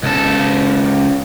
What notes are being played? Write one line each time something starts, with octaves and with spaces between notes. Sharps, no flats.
C#2 A4